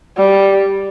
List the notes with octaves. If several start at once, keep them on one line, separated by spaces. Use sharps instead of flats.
G3